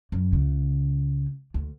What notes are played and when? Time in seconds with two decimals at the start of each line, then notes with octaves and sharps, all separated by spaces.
0.12 F#2
0.33 C#2 C#3
1.54 D2